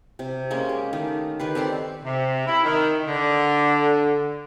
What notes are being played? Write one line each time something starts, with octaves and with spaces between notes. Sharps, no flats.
C3
G#3 A#3 C#4
G4
D#3 A3
D#3 G4 B4
C4 A4 D5 C6
C3
E4
D#3
D3